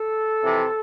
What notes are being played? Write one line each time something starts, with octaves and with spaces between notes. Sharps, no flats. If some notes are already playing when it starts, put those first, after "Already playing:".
Already playing: A4
F2 C3 E3